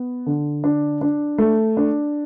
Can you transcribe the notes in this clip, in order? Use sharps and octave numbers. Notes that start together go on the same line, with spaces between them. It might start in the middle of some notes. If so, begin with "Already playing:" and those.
Already playing: B3
D3
D4
D4
A3
D4